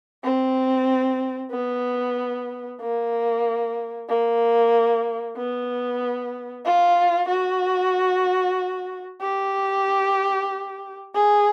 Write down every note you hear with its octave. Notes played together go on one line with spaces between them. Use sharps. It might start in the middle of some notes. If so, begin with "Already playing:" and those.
C4
B3
A#3
A#3
B3
F4
F#4
G4
G#4